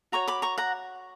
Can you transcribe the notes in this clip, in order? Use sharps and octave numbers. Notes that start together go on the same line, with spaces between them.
F#4 C#5 A#5 C#6
B5 D6
A#5 C#6
F#5 A#5